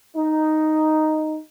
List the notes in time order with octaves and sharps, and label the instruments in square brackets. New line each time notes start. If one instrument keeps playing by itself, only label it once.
[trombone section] D#4